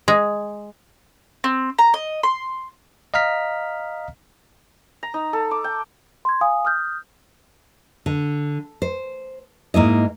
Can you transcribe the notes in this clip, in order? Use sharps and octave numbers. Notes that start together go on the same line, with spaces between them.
G#3
C4
A#5
D#5
C6
D#5 F5 A#5 F6 B6
A#5
D#4
A4
D6
G5
C6 G#6
F5 G#5 D#6
D#6 F6 G6
D3
C5
G#2 A#3 E4 D#5